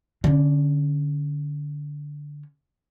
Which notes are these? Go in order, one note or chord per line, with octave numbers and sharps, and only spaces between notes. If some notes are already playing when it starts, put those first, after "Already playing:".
D3 C#4